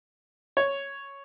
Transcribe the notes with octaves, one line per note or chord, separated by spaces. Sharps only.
C#5